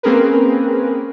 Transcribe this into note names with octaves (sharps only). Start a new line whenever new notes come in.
A#3 C4 C#4 G#4 A#4 B4